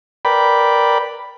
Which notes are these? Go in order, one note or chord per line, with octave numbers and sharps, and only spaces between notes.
A#4 B4 D5 G5 B5